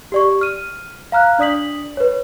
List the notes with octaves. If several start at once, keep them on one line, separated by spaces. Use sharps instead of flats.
G4 D5 C#6
F6 D#7
F5 A#5 F6 F#6
D4 D5 D#6 B6 F#7
B4 C#5